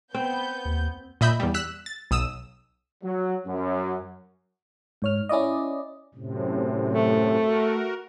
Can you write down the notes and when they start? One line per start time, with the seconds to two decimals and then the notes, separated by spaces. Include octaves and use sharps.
0.14 B3 C4 G6
0.65 D#2
1.21 A#2 D#5 E5 B5 G6
1.40 E2 G3
1.54 E6 F#6 B6 E7
1.86 A6
2.11 B1 D#6 E6 E7
3.04 F#3
3.46 F#2
5.02 G#2 C#5 F6
5.29 C#4 E4 D5 D#5
6.15 F#2 A2 C3
6.89 A3
7.42 F#4 A#4